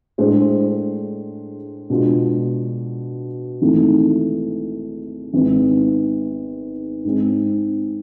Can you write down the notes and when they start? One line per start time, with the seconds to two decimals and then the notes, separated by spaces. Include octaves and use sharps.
0.18 A2 G#3 D4 G#4 C5
1.90 B2 G#3 D4 F4
3.62 G#1 G#2 E3 A3
5.33 G#1 G#2 G#3 B3 E4
7.05 G#2 G#3 C4